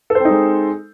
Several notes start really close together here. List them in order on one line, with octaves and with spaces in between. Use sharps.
A4 C5 C4 D#4 G#3